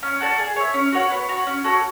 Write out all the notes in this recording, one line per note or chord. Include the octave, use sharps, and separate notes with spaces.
C#4
F#4 A4 D5
G#4
C#5 E5
C#4
F#4 C#5 F#5
B3
F#4 C#5
C#4
F#4 A4 C#5